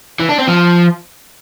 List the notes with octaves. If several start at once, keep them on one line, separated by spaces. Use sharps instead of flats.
E3
D4
C4
F3